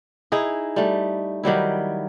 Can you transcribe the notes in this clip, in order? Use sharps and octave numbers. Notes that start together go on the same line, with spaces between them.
D#4 E4 G#4 D#5
G3 A3
D#3 F#3 G3 E4